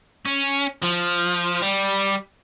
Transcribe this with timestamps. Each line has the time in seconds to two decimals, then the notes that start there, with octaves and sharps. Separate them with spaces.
0.25 C#4
0.82 F3
1.62 G3